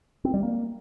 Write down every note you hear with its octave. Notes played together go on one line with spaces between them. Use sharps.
C4
G3
A#3